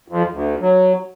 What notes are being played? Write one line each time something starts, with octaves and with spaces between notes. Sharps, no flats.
F2
D2
F#3